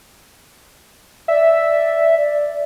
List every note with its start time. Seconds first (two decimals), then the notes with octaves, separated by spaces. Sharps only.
1.28 D5 E5
2.17 D5